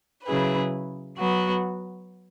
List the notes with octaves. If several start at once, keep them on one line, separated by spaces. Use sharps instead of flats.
C#3 F#3 E4 G#4 B4
F#3 B3 F#4